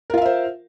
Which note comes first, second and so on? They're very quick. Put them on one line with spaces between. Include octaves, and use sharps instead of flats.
A#4 F4 F5 E5 C5